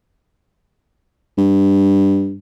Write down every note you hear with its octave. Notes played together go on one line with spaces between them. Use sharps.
G2